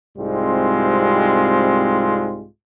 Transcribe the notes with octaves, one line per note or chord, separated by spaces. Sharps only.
C2 G#2 G3 G#3 C4 F4